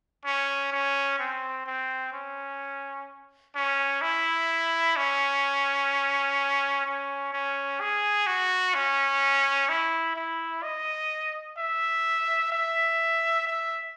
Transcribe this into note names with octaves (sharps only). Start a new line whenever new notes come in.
C#4
C#4
C4
C4
C#4
C#4
E4
C#4
C#4
C#4
G#4
F#4
C#4
E4
E4
D#5
E5
E5
E5